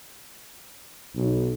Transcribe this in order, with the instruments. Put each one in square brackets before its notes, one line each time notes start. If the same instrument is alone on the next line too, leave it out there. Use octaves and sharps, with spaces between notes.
[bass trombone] B1